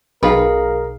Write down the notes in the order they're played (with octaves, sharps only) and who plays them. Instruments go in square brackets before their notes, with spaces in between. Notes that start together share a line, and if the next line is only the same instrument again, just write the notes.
[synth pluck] B1 [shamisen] D#3 B4 B5 [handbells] G#4 F5 [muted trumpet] A#4